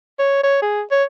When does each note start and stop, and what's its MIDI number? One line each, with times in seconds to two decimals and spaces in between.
0.19 0.43 73
0.43 0.59 73
0.62 0.82 68
0.91 1.03 73